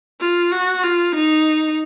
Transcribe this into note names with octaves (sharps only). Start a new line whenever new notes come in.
F4
F#4
F4
D#4